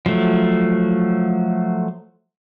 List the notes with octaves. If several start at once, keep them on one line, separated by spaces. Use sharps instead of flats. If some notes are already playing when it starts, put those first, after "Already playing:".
F3 F#3 A3